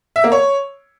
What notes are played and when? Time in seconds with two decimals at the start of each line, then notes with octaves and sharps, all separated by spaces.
0.16 E5
0.24 A#3
0.32 C#5